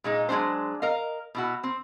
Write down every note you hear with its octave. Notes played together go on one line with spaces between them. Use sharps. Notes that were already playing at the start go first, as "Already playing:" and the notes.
A#2 G#3 D#4
F#3 G#3 C4 D4 C5
A#4 D#5 F5
B2 E4 F#4
C4